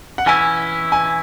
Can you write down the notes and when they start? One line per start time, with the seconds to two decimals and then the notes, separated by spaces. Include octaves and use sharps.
0.18 F#5
0.26 E3 C#4 E4 G#5
0.92 G#5